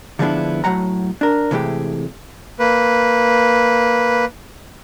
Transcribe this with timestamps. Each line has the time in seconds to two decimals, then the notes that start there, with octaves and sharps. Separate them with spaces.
0.19 D3 F3 G#3 B3 D4 E4
0.64 A2 F#3 F#5 A#5
1.21 D4 A#4
1.51 C3 E3 G#3 A3 G4
2.59 A#3 B4